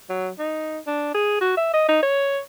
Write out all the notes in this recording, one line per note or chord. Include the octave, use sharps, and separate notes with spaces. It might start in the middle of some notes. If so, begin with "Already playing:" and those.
F#3
D#4
D4
G#4
F#4
E5
D#5
D#4
C#5